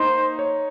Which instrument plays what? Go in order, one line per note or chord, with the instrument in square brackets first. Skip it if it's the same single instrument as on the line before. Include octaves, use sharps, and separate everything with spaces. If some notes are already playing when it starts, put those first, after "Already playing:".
Already playing: [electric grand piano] A#3 D#4 [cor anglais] C5
[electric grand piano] C#5